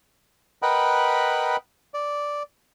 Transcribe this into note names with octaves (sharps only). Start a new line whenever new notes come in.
A#4 B4 D#5 F#5 G5 B5
D5